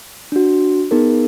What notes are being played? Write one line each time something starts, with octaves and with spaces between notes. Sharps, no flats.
D4 F#4
B3 D#4 G#4 A#4